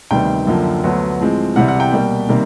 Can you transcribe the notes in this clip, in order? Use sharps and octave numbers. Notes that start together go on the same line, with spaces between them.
D2 C3 D#3 G3 B3 G5
F#2 D3 F3 A#3
D2 D3 F#3 B3
A2 F3 G#3 C4
C2 C3 E3 G3 F#5
F#5
G5
B2 G3 A#3
C3 D#3 G3 A#3